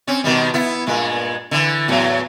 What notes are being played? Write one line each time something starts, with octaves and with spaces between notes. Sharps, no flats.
C4 C#4
B2 D#3 G3
B3 E4
G2 A#2 G#3
D3 E3
E2 A2 F#3